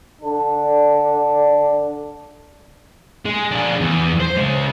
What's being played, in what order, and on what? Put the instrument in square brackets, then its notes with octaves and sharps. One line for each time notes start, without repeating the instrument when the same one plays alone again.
[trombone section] D3 D4
[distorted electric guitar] G#3
D4 G#4
E2
C5
C#3 G#3